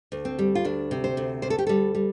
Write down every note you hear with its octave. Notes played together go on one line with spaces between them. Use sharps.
D2
C4
G3
F4
D2 D4
C3
C5
D2
D2 C5
A4
G4
G3 A4
G3